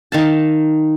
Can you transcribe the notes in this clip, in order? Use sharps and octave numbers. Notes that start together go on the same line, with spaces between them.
D#3 F5 A5